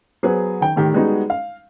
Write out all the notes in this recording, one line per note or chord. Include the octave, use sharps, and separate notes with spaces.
F#3 B3 G#4 B4 C5 F#5
D#3 G5
A2 D#3 G4
G3 G#3 B3 D#4 F#4
F5